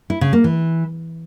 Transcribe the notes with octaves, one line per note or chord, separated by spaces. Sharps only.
E4
C#3
A#3
E3